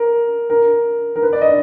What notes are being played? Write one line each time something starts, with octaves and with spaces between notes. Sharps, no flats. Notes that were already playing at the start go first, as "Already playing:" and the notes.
Already playing: A#4
A#4
A#4
B4
D5
D#5